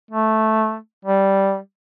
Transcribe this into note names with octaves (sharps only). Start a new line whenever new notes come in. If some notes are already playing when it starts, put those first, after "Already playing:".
A3
G3